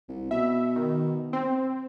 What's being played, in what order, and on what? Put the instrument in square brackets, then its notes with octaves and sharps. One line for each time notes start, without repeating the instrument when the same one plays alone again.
[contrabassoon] C2
[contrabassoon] B2 [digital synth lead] E5
[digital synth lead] D#3
C4